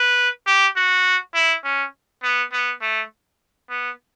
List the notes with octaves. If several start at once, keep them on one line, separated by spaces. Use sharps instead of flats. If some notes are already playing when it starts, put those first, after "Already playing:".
Already playing: B4
G4
F#4
E4
C#4
B3
B3
A3
B3